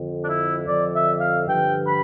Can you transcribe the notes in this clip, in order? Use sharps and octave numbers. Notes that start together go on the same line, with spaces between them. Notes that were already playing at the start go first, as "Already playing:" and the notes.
Already playing: F2 D3 F3
D4
E4
F2 D3 F3 D5
E5
F5
G2 D3 F3 G5
B5